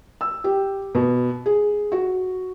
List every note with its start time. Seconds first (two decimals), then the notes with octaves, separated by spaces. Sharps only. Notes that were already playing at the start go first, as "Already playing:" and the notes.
0.21 E6
0.44 G4
0.95 B2
1.46 G#4
1.92 F#4